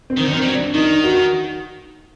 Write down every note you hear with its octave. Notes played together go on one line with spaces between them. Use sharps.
C4
D#3
D3
D#3 C4
G3
F#3
D4
D#3 D#4
F#4